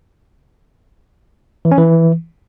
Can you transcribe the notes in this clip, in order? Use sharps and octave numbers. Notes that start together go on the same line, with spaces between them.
E3
C#4
E3